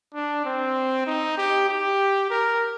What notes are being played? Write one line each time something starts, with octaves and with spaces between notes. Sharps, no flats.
D4
C4
D#4
G4
G4
A#4